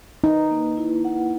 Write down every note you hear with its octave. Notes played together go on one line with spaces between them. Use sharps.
D#4 B4
A#3
E4
F#5